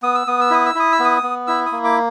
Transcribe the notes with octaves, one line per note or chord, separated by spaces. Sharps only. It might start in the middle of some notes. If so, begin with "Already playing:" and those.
B3 D#6
E6
B3 D#6
E6
E4 D#6
E6
E4 D#6
E6
B3
D#6
B3
E4 E6
D#6
A#3
D6